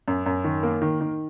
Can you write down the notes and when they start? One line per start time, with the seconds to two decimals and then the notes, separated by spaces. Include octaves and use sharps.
0.08 F#2
0.26 F#2
0.44 D#3
0.63 A#3
0.82 D#3
1.01 D#3